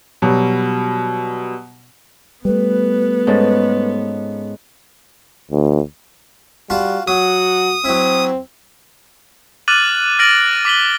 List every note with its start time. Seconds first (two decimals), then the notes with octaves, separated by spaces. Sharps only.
0.22 B2 F#3 G3
2.45 G3 A3 B3 B4
3.27 G#2 C#4 A4
5.51 D2
6.70 G3 F4 F#4 A5
7.07 F#3 F#4 D#6
7.84 F#3 C4 E4
9.68 D6 F6 F#6 A6 D#7 F#7
10.19 F6 A6 A#6 D7 F#7
10.65 D6 B6 F#7 G7